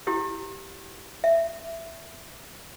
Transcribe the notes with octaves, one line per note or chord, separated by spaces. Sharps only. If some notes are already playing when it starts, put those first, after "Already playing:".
E4 G4
E5